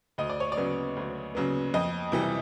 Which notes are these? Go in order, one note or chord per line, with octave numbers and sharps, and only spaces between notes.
D2 D#5
D5
C#5
D5
C#3 F#3 B3
D2
C#3 F#3 B3
F2 D#5
C3 E3 G3